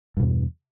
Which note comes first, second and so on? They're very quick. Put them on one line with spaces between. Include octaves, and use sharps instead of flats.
G2 B2 E2